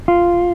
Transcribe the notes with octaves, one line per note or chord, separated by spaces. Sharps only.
F4